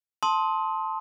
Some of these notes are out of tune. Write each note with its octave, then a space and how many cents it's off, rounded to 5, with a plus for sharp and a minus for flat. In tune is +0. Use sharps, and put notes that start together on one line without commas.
A5 +0 C6 +5 D#6 +30